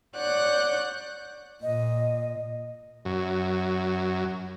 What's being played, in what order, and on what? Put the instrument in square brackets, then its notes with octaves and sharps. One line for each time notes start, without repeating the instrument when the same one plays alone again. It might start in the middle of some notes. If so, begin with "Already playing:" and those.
[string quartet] C#5 D5 F#5 F#6 G6
[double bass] A#2 [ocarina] D#5
[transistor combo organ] F#2